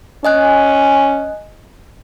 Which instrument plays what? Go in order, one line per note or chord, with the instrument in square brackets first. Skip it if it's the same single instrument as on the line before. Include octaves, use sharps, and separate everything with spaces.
[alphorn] C#4 [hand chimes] D#5 G#5 F#6